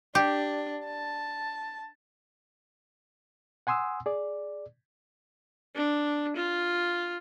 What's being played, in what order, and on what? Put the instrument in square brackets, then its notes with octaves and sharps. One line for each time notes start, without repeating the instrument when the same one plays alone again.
[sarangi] D4 [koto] G4
[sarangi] A5
[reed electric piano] F#5 G#5 C6 D#6 E6
G#4 D5
[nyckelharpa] D4
F4